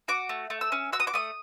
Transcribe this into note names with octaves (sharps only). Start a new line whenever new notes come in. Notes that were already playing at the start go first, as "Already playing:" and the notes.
F#4 D6
A3
A3
E6
C#4
F#4 E6
D#6
D6
A3 D#6